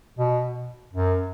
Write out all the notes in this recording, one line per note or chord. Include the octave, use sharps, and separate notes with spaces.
B2
F#2